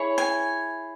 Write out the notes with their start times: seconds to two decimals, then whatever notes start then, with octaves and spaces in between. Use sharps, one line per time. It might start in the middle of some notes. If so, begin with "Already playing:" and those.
Already playing: E4 G#4 C#5
0.18 G#5